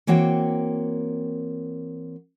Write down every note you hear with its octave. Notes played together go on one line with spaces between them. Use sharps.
E3 A#3 C4 F#4 C#5 G5